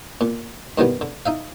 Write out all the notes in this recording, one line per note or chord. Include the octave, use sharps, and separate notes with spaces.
A#2
G2 B2 D#3 E3 G3 B3
D3
D#4 E5 F5